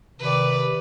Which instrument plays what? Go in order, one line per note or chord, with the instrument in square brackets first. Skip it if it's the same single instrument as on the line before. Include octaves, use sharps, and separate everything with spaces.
[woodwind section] C3 D#3 [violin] B4 D5